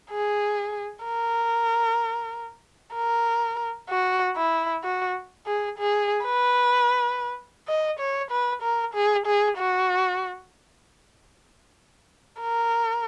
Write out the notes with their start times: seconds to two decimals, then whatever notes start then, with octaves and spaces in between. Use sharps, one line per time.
0.11 G#4
1.05 A#4
2.94 A#4
3.89 F#4
4.36 E4
4.84 F#4
5.47 G#4
5.78 G#4
6.26 B4
7.68 D#5
7.99 C#5
8.31 B4
8.62 A#4
8.94 G#4
9.26 G#4
9.58 F#4
12.41 A#4